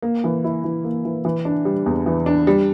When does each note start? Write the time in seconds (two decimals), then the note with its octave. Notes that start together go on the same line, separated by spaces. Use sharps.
0.02 A#3
0.24 E3
0.44 E4
0.64 E3
0.84 A#3
1.05 E3
1.25 E3
1.45 D4
1.65 G3
1.86 E2
2.06 E3
2.26 D4
2.47 G3